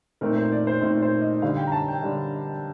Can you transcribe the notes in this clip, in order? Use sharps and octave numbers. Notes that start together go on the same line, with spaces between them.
A#2 A3 C4 D#4 A#4
C5
D5
C5
A#2 A3 C4 D#4 C5
C5
D#5
D3 G3 D4 F5
G5
A#5
A5
G5
D3 G3 D4